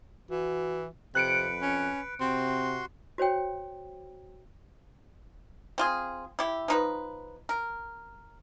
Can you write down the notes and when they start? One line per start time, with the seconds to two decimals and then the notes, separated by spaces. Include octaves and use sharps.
0.31 E3 F#4
1.15 F2 C3 B4 F#6 C#7 D7
1.62 C#4
2.20 C3 C4 F#4 C6
3.18 F#4 C5 C#5 G5
5.78 C4 F4 G#4
6.39 E4 G4
6.68 F3 D#4 B4
7.49 A#4